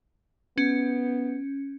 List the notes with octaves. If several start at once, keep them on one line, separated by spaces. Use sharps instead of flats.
B3 C#4